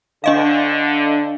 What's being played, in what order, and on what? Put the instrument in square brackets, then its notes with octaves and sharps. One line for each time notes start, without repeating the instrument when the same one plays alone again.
[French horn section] D3 [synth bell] D4 D#5 F5